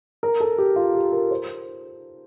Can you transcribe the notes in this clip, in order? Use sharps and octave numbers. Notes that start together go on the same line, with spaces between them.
A#4
A4
G4
F4
G4
A#4
C5